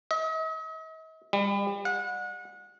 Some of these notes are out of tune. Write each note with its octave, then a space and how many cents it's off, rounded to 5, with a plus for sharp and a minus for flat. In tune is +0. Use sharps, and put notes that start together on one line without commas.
D#5 +45
G3 +35
F#5 -30